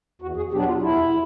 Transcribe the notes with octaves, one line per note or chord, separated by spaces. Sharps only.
E2 F#4
G#4
B2 F#3 B3 D4 G4
F4
E2 E4